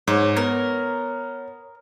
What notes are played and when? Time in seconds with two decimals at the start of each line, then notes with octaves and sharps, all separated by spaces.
0.07 G#2 C#5
0.37 B3 A#4